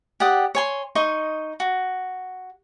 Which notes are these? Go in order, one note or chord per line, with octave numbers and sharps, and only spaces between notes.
G4 D5 F#5 D#6
C#5 G#5 C6
D#4 D#5 C6 C#6
F#4